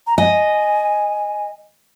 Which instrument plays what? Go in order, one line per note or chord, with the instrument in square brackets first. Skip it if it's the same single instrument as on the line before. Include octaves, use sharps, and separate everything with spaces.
[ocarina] A#5
[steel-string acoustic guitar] D#5 [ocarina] G#5